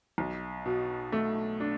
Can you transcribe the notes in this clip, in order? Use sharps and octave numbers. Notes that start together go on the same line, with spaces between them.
B1
B2
A3
D4